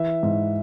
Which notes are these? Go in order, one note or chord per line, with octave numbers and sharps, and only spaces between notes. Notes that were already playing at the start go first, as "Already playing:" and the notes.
Already playing: E3 E5
G#2